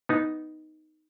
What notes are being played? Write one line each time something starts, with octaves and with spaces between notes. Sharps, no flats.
B3 D#4